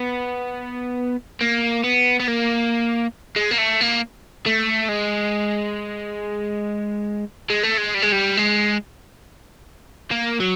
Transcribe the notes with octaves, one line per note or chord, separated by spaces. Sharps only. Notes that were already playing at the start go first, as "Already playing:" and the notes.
Already playing: B3
A#3
B3
B3
A#3
G#3
A#3
A3
A#3
A3
G#3
G#3
A3
G#3
G3
G#3
G3
G#3
A#3
F#3